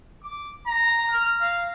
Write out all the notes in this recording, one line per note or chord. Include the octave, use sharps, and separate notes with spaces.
D6
A#5
F6
F5